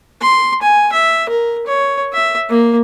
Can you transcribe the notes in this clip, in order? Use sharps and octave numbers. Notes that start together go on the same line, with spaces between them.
C6
G#5
E5
A#4
C#5
E5
A#3